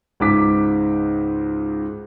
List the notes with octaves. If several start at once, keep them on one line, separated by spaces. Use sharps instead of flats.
C#2 G#2 D6 B6